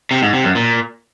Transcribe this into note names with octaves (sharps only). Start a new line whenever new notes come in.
C3
G#2
C3
F#2
A#2